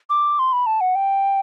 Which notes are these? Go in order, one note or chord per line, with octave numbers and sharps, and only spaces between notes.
D6
C6
B5
A5
F#5
G5